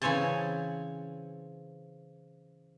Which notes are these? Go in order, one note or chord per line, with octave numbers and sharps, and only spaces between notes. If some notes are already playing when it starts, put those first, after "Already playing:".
C#3 E3 C4 C#5 G#5 A5